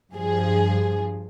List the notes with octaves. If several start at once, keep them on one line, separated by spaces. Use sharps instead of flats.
G2 F3 G#4